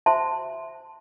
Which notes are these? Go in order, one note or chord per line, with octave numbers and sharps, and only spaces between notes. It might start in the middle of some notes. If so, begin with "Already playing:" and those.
F#4 C5 E5 A5 C6